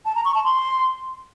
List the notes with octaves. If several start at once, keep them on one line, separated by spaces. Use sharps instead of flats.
A5
A#5
C#6
A5
C6